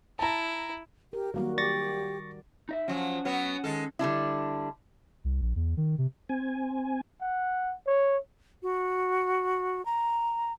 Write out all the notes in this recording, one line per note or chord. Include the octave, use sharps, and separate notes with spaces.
E4 A5 A#5
G4 A#4
D#3 F#3 G3 A#3 F#4 A#4
G4 D5 C#6 A6 A#6
D#4 D#5 E5
F3 F#3 C#4
F#3 B3 C#5
D#3 G#3 A4
D3 G3 D4 E4
C2
A#1
E2
D#3
C3
C4 G#5
F#5
C#5
F#4
A#5